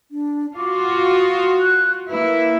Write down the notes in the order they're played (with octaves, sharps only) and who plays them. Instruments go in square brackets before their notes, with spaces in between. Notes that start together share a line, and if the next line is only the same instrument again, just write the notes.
[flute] D4
[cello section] F4 F#4 [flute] D6
[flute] D#6
F#6
[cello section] A#3 E4 [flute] B4